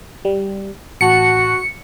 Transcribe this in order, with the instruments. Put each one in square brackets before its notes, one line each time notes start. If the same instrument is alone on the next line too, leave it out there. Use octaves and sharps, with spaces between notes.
[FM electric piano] G3
[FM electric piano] A1 A5 F#6 [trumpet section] F#4 [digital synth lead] C#7